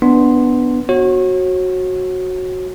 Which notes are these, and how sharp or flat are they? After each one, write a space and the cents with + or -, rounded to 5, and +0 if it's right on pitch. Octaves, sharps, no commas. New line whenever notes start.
B3 +0 D4 +0 C6 +0
F#4 +0 C#5 -35